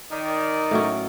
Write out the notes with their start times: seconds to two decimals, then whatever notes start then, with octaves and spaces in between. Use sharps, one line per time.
0.11 D#3 D#4 D5
0.71 A2 F#3 C#4